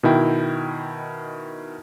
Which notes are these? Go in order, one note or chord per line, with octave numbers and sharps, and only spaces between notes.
B2 D#3 E4 G5